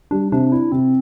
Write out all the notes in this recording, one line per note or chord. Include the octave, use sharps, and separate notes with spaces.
G3 D4
C3 D4
D4 E4
C3 C4